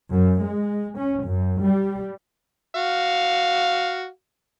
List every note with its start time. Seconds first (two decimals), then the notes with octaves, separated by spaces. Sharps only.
0.12 F#2
0.42 G#3
0.97 C#4
1.26 F#2
1.63 G3
2.75 F#4 F5